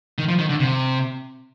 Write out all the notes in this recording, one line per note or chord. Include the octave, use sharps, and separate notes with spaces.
D#3
F3
D#3
D3
C3